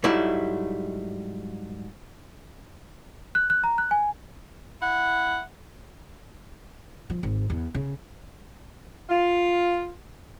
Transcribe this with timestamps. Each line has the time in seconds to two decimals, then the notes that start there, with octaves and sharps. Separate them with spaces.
0.04 G#2 F#3 G3 A3 E4
3.35 F#6
3.50 F#6
3.64 A#5
3.78 F#6
3.91 G#5
4.80 E4 F#5
7.10 F3
7.23 G#1
7.50 E2
7.74 C#3
9.10 F4